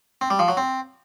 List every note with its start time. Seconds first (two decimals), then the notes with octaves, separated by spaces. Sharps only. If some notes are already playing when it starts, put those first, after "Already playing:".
0.21 C4
0.30 G3
0.39 F3
0.48 F#3
0.57 C4